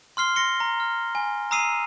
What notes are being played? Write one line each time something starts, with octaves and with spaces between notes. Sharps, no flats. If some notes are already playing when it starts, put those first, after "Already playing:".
C6 F6 C7 G7
C6 A#6 C#7 G7
A#5
F6
G#5
A#5 D#6 E6 C7 D#7 F7